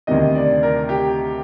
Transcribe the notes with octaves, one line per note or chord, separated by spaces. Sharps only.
D2 C3 D#3 D#5
D5
A#4
G4